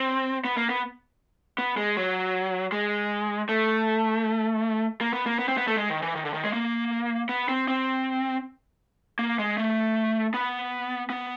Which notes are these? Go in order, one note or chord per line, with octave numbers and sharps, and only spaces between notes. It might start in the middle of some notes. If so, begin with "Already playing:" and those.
Already playing: C4
B3
A#3
B3
B3
G#3
F#3
G#3
A3
A#3
B3
A#3
B3
C4
B3
A3
G#3
D#3
E3
D#3
D3
D#3
G#3
A#3
B3
C4
C4
A#3
G#3
A3
B3
B3